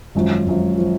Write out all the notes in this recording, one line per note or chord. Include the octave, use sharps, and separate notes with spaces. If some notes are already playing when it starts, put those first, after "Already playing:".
G#1 F#2 F3
G#1 F#2 F3
F3